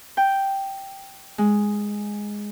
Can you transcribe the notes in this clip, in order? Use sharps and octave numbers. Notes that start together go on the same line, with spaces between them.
G5
G#3